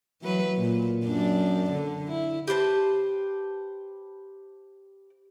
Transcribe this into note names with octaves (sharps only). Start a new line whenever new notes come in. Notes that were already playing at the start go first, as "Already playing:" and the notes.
E3 F#3 B4
A#2
F#2 D4 D5
D3
E4
G4 B4 C5 A5